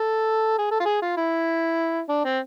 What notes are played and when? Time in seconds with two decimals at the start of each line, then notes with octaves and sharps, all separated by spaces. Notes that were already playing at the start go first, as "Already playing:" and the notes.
Already playing: A4
0.58 G#4
0.71 A4
0.80 F4
0.85 G#4
1.02 F4
1.17 E4
2.09 D4
2.25 C4